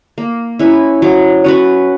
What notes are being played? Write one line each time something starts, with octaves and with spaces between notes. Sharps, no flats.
A#3
C#4 E4 B4
F#3
C#4 F#4 B4